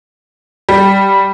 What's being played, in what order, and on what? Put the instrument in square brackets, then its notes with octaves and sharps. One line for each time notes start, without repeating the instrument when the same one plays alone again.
[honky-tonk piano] G3